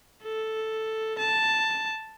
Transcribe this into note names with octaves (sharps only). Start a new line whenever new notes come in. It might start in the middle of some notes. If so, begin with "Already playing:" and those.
A4
A5